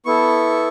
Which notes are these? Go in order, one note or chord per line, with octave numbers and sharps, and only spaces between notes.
B3 E4 A4 C#6